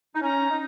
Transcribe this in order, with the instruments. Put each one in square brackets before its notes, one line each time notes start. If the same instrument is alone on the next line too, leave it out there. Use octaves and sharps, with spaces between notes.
[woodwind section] D#4
[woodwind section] C#4 [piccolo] A#5
[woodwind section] D#4